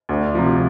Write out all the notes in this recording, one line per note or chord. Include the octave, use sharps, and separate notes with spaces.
D2
C3 F3